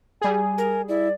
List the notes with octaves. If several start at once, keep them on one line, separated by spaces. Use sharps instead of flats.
G3 G#4 G#5
A#4
E4 D5